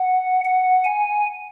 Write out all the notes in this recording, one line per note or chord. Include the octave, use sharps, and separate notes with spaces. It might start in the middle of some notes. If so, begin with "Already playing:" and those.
Already playing: F#5
F#5
G#5